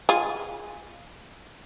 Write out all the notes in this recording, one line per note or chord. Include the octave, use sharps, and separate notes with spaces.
F4 G#4